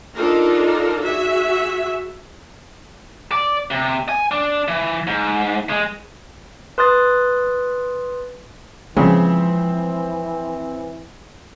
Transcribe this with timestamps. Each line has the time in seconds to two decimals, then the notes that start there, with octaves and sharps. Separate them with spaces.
0.15 D4 D#4 F4 A4 A#4
1.04 F#4 G#4 E5
3.32 D5
3.71 C3
4.09 G#5
4.31 D4
4.68 E3
5.07 G#2
5.70 G#3
6.78 B4 C6 D#6 F#6 A6
8.97 C#3 E3 F3 G#3 C4